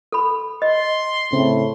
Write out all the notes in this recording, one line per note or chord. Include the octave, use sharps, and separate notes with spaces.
A4 B5
D#5 C6
A2 C#3 C4